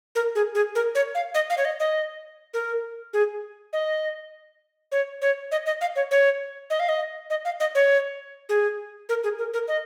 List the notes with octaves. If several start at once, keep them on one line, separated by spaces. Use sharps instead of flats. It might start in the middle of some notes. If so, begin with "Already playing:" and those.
A#4
G#4
G#4
A#4
C#5
F5
D#5
F5
C#5
D#5
D#5
A#4
G#4
D#5
C#5
C#5
D#5
D#5
F5
C#5
C#5
D#5
F5
D#5
D#5
F5
D#5
C#5
G#4
A#4
G#4
A#4
A#4
D#5